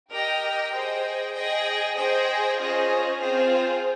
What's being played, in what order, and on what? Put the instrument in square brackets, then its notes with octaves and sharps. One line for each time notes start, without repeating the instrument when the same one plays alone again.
[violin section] G4 A#4 D#5 G5
G#4 C5 D#5 G5
G#4 D#5 G5
G#4 C5 D#5 G5
C#4 F4 G#4 C5 D#5
C4 F4 G#4 C5